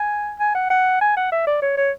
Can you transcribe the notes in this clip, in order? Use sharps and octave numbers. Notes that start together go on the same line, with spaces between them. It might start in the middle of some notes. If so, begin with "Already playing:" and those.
Already playing: G#5
G#5
F#5
F#5
G#5
F#5
E5
D5
C#5
C#5